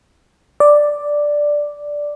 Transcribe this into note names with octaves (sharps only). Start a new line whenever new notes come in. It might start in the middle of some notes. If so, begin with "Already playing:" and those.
D5